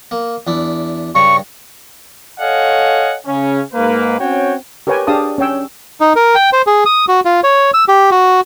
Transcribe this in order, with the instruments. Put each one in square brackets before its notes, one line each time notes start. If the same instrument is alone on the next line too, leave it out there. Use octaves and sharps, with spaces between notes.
[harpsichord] A#3
E2 D4 E4
[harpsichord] G2 C#3 A#5 [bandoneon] C#6
[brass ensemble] A4 C#5 D#5 F5 F#5 G#5
C#3 C#4
G#2 A#3 B4
C4 C#4 F#4 C#5 G5
[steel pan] G4 A#4 B4 C#5 G5 G#5
D4 G4 G#4 F5 A5 D#6
C#4 C#5 G5 E6
[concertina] D#4
A#4
G5
C5
G#4
D#6
F#4
F4
C#5
E6
G4
F#4